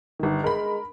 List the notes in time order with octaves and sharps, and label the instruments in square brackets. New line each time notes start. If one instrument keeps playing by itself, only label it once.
[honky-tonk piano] G1 D#3
[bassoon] G#3 [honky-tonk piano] A#4 B5